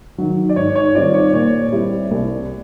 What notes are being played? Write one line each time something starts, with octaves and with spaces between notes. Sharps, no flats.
D#3 F#3
D5
G#2 C#5
C#5
D#3 G3 C4 F4 D5
C#5
A#2 C#5
G3 C4 E4 G4
C2